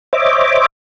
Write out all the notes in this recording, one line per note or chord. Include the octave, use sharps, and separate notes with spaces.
C5 C#5 D#5 E5 D6